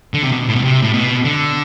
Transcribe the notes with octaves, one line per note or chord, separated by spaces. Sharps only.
D3
C3
B2
A2
B2
C3
A2
B2
D3